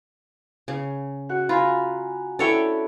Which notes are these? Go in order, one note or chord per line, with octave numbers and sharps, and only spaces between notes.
C#3
F#4 F#5
F4 G#5 A#5 B5
C#4 D4 E4 A4 C#5 G5